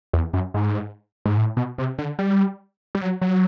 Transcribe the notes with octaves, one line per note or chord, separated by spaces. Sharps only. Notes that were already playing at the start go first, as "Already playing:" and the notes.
E2
F#2
G#2
G#2
A2
B2
C3
D3
G3
G3
F#3
F#3